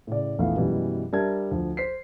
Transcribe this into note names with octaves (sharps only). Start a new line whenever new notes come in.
A2 C#3 D5
A#1 E2 A3 B3 E4 F5
F#2 B2 E3 G3 G#3
G3 D4 A#4 E5 A5 G#6
D2 F3
C5 B6 C7